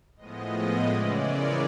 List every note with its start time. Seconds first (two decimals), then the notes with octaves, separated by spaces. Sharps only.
0.16 A2 F3 G#3 B3 D#5
0.88 C#3 E3 G#3 C#4 D5
1.24 A#4